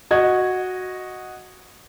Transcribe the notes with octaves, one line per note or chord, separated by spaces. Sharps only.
F#4 D#5 G#6